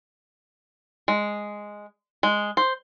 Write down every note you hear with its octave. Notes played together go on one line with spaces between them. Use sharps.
G#3
G#3
C5